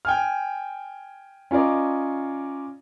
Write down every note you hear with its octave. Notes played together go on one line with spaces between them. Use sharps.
G5 G#5 F6
C#4 F4 A#4 D5 D#5